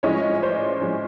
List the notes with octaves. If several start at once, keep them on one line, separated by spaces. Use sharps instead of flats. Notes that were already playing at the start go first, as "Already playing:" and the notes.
A2 F3 G#3 C#4 C#5 D#5
C5 D5
A2 F3 G#3 C#4